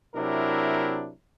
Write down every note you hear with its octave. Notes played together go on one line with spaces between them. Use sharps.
C3 F#3 D4 E4 A#4